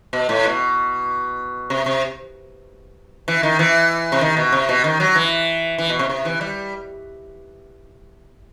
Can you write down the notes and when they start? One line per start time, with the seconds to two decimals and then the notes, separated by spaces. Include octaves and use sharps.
0.13 B2
0.29 A2
0.45 B2
1.70 C3
1.86 C3
3.28 E3
3.43 D#3
3.59 E3
4.12 C3
4.21 D#3
4.37 B2
4.52 C3
4.69 B2
4.84 D#3
5.00 F#3
5.16 E3
5.78 E3
5.89 B2
5.99 C3
6.10 C3
6.25 E3
6.41 G3